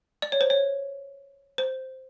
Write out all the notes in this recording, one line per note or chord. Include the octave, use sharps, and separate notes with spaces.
D5
C#5
C5
C#5
C5